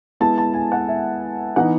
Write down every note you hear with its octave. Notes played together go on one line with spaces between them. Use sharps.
G#3 B3 E4 A5
A5
G#5
F#5
E5
E3 B3 D#4 F#5